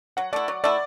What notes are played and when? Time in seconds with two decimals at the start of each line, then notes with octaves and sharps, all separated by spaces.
0.17 F#3 F#5
0.33 A3 E4 D5
0.48 F#3
0.64 A3 E4 D5